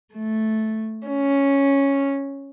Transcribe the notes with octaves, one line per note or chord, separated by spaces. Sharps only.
A3
C#4